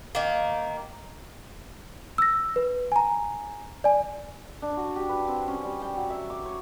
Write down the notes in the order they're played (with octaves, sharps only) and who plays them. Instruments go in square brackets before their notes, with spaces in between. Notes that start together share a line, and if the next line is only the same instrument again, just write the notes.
[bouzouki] D#3 A#3
[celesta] E6 A#6
B4
G#5 A#5
D5 G#5
[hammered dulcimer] D4
F#4
G4
B4
C4
C#4
G3
G5
F#3
E5
D6
C#5